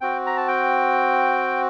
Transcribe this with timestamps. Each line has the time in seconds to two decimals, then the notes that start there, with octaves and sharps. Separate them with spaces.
0.01 C4 F#4 G5
0.26 A#5
0.37 A5
0.48 G5